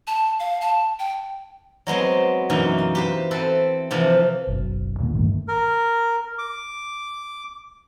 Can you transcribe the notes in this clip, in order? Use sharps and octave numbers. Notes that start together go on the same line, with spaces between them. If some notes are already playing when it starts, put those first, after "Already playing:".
A5
F5
A5
G5
F#3 G#3 B3 C4
F#2 B2 E3 A#3 D#4
B3
G4 B4 C5
C4 A4 B4 E5
C3 E3 F3
F#1 B1
D#2 A#2 D3 A#3
A1 G2 D#3 A3
A#4
D6